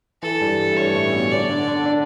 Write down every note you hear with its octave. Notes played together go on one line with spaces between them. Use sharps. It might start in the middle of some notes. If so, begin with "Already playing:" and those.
E3 A4
G2 G3
A3
G2 G3 C#5
A2 A3
C#4
B2 B3
D3 D4 D5
D3 D4
D3 D4
D3 D4